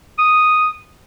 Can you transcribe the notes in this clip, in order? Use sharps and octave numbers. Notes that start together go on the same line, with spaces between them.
D#6